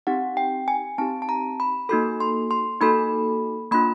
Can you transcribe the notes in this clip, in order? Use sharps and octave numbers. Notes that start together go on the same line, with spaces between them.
C4 D#4 G4 F#5
G5
G#5
C4 D#4 G4 A5
A5
A#5
B5
A#3 D#4 F#4 A4 B5
C6
C6
A#3 D#4 F#4 A4 B5
A#3 D4 F4 B5